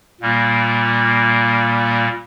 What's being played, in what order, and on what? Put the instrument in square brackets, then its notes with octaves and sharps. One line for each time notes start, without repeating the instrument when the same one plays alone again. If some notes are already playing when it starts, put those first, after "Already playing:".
[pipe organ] A#2 G3 A#3